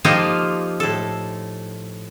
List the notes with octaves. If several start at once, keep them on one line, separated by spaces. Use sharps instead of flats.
F3 A#3 D#4 F4 G4 A4
A2 A4